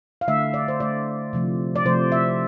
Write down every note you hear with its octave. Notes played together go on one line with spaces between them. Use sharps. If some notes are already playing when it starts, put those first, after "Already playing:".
F5
D3 A3 E5
D5
C5
D3 A3 D5
C3 F3 A3
D5
C3 F3 A3 C5
E5